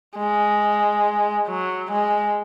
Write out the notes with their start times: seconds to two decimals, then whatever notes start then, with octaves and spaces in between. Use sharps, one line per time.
0.17 G#3
1.48 F#3
1.91 G#3